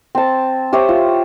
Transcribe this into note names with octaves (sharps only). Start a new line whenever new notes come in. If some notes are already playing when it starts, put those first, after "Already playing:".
C4 A5
G4 C5 C#5 E5
F4